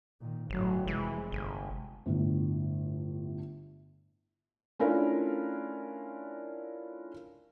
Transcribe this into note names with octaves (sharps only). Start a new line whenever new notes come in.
A#2 D#3
G1 A2 F#3
F1 E3 G#3
G1
G1 A2 D3
A3 C#4 D4 E4 F4 A#4